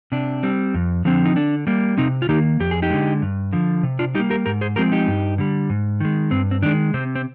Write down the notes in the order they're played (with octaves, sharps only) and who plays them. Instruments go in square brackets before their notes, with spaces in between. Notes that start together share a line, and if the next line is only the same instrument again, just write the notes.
[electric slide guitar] C3 D4
G3 C4
F2
D3 F3 C4
D#4
D3 D4
G3 A#3
C3 C4 D#4
F4
D#3 A#3 D#4 G4
F2 G4
G#4
D#4 G4
D3 G#3
G2
D3 F3
C3
D4 F4
G3 D#4 G4
A#3
G4 A#4
G#2 G4 A#4
G#4 C5
F3 G#3 C4 G4 A#4
D#4 G4
G2
D3 G3
G#2
D#3 G#3
G2 C4
C4
D#3 G#3 D4
C3 C4
C4